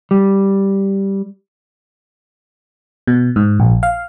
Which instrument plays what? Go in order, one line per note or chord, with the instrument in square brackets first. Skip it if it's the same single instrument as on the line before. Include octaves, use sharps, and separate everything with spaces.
[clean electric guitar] G3
[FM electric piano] B2
G#2
A#1
F5